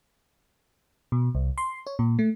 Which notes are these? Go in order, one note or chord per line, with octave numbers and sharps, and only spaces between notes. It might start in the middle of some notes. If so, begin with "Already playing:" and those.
B2
C2
C6
C#5
A#2
A3